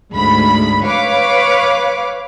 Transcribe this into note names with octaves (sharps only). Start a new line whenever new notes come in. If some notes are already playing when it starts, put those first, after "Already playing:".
D2 G#2 B5
B4 C#5 F5 D6